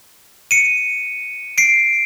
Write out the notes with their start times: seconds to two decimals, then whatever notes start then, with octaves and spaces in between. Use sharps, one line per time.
0.51 C#7 D#7
1.58 C7 D7